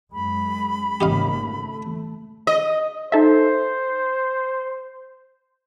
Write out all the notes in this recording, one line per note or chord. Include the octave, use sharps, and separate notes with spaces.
F#2 G#3 B5
G#1 C#3 A#3 G4 D#5 F5
A3
D#5
D#4 A4 C5 E5